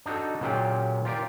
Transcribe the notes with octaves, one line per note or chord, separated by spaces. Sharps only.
D4 D#4 F#4 A4
A#2 C#3 F#3 F4 G4 G5
F4 G4 A#4 D5